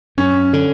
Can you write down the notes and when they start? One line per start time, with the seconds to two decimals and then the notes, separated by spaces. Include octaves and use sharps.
0.17 F#2 C#4
0.53 D3